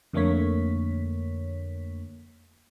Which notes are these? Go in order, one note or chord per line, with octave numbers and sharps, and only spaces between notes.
F2 D3 A3 A#3 C#5 B6